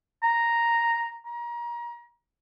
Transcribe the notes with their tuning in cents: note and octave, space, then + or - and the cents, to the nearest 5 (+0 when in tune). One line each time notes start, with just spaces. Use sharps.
A#5 +0
A#5 +30